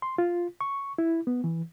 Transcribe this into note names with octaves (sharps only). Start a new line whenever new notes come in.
C6
F4
C#6
E4
B3
E3